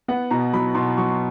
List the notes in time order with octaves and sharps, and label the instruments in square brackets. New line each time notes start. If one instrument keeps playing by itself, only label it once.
[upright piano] B3 F#5
B2 A#5
F#3 B5
B2 C6
F#3 C#6